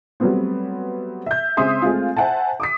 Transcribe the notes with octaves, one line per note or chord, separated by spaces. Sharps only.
F#3 G3 A3 B3 C4
E5 G6
C#3 G#3 C4 E5 C6 D#6
G#3 A3 C4 F4
C5 E5 F#5 G#5 A5
D6 D#6 B6